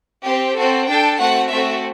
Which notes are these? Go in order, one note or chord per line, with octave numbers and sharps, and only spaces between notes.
C4 G4
C4 F#4 A4
D4 A4 G5
A3 C4 F#4 F#5
A3 C4 F#4 A4 E5